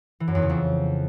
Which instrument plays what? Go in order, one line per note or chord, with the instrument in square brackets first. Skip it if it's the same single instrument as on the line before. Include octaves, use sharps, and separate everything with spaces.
[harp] E3
F#2
E2
C#3
F2